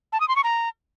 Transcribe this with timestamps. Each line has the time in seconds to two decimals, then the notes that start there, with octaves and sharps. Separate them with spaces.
0.13 A5
0.20 D#6
0.28 C6
0.36 C#6
0.44 A#5